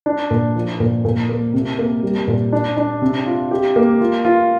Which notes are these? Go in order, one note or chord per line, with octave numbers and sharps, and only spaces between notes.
D4
A#2
F3
A#2
A#2
A#3
C3
A#3
G3
A#2
D4
D4
C3
F4
G4
A#3
F4
F4